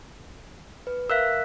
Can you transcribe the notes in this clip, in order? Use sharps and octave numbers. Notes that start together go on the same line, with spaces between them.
B4
A#4 E5 F5 E6 F#6 B6